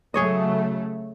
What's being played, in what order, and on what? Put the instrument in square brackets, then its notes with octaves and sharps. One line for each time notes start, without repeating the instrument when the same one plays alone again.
[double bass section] C#3 F#3 A3 [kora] G#4 C#5 D#5